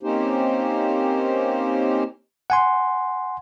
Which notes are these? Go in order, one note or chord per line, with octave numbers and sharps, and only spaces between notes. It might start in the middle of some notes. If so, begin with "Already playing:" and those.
A#3 C4 C#4 D#4 G4 C5
F#5 G#5 C6